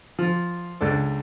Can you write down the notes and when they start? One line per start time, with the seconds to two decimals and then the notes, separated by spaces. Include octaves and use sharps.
0.19 F3
0.81 C#2 D4 A4